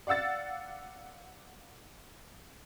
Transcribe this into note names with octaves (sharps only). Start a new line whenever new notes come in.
D5 F5 F#5 E6 A6